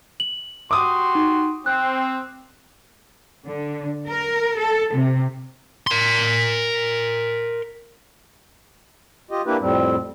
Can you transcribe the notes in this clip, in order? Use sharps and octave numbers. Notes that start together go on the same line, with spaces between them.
F#7
F#4 G4 C6 D6 D#6
D#4
C4 F#6
D3
A#4
A4
C3
A#4 C6
F4 G4 D#5
A#3 D4 E4 G4 B4
F2 A2 G3 C4